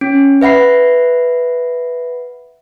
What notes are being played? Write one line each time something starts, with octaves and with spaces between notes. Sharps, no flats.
C#4
B4 E5 F#5 B5 C7